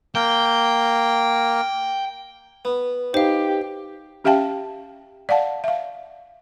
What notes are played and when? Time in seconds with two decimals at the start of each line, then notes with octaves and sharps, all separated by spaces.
0.15 A#3 G5
2.65 B3
3.14 D#4 G4 C5 F5
4.24 C#4 G4 E5 F5 G5 A5
5.29 D5 F5 F#5 A5
5.64 E5 F5